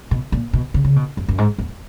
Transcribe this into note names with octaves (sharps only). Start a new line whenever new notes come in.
B2
A#2
B2
C#3
C#3
B2
F#2
F#2
G#2
E2